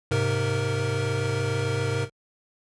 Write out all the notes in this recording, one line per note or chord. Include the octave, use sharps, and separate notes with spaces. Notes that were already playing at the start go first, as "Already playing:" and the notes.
G#2 C3 A#4